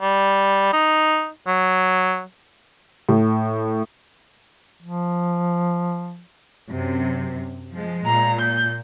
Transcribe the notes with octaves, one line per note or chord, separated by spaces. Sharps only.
G3
D#4
F#3
A2
F3
F#2 C3
F3 G#3
A#2 A#5
G6